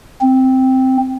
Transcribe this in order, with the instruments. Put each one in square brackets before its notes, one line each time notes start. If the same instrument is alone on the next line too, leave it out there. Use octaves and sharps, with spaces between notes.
[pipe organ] C4